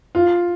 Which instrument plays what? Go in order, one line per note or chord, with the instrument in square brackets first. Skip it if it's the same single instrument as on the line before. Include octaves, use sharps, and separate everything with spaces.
[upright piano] F4